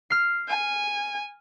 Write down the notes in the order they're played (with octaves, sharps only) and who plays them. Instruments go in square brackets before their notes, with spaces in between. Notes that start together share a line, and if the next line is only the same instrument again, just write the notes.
[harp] F6 C7
[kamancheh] G#5